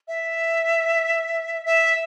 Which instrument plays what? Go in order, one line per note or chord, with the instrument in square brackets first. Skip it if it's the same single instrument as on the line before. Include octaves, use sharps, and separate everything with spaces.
[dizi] E5
E5